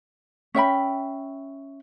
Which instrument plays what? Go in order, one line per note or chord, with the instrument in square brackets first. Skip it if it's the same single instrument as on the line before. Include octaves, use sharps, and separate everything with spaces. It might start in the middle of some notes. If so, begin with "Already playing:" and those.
[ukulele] C#4 E5 G5 B5